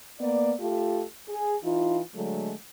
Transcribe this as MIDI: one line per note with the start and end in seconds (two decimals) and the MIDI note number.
0.20 0.53 58
0.20 0.53 59
0.20 0.53 74
0.60 1.03 57
0.60 1.03 65
0.60 1.03 67
0.60 1.03 69
1.28 1.56 68
1.63 2.00 52
1.63 2.00 63
1.63 2.00 65
2.14 2.52 50
2.14 2.52 54
2.14 2.52 56
2.14 2.52 57